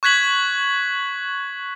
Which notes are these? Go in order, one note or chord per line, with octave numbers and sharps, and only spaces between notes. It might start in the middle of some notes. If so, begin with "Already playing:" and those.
C#6 F#6 G#6 B6 F#7